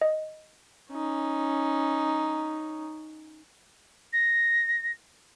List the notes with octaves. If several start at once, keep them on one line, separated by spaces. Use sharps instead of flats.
D#5
C#4 D#4
A#6